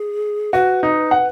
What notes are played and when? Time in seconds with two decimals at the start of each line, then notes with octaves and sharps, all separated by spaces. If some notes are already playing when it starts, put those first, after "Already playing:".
Already playing: G#4
0.53 F#4 B4
0.83 D#4
1.11 F#5